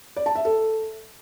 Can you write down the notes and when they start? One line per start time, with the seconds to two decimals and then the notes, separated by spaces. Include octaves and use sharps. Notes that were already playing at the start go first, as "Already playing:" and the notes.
0.16 D5
0.26 A5
0.35 E5
0.45 A4